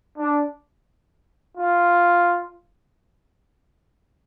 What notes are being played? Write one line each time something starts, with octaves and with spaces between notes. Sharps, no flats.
D4
F4